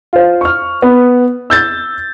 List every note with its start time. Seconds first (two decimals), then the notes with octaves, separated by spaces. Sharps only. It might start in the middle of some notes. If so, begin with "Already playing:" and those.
0.13 F4 C5
0.41 C#6 F6
0.82 B3
1.50 E6 G6 A6